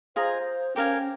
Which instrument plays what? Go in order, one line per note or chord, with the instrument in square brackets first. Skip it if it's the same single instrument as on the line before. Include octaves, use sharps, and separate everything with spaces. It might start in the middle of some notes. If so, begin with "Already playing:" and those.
[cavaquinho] F4 G#4 D#5 A#5 [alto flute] C5
[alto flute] C#4 [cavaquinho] G4 A#4 F5 G#5